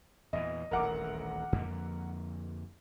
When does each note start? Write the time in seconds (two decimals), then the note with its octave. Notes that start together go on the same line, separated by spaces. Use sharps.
0.33 E2 A#2 E3 D#5
0.71 D#1 A1 D2 A#4 F#5 D6
1.52 F2 D3 A#3